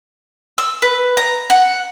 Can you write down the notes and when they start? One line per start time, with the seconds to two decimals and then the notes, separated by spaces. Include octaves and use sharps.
0.58 E6
0.82 B4
1.17 A#5
1.50 F#5